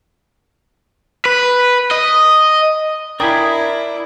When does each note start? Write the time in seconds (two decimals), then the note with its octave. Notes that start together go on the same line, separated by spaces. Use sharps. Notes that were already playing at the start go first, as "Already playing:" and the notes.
1.25 B4
1.91 D#5
3.20 D4 E4 A#4 D5 G5 G#5 B5 D#6